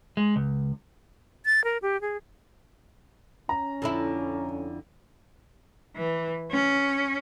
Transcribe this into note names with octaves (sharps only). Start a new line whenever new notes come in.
G#3
C#2
A6
A#4
G4
G#4
C#4 A#5
F2 D3 E4
E3
C#4